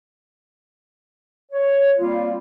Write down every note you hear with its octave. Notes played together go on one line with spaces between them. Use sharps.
C#5
G3 A#3 C4 F4